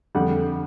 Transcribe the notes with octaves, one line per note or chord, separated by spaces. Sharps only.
F2 D3 G3 F#5